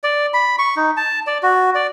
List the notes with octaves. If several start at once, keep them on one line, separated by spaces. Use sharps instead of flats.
D5
B5
C#6
D#4
A5
D5
F#4
D5